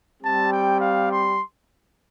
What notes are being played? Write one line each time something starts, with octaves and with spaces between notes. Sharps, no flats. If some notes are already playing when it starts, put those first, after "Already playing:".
G3 C4 G4 A5
G5
F5
C6